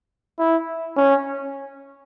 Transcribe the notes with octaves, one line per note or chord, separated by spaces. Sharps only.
E4
C#4